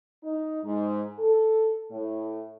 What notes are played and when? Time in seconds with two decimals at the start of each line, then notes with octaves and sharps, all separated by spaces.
0.24 D#4
0.64 G#2
1.19 A4
1.91 A2